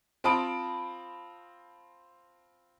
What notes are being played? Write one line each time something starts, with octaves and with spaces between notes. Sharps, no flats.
C4 F4 A5 B5 D#6 D7